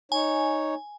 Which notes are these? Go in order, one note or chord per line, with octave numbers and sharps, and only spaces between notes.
D#4 C#5 G#5